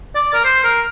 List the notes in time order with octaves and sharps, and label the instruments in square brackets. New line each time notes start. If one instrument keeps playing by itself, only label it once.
[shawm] D5
A#4
C5
A#4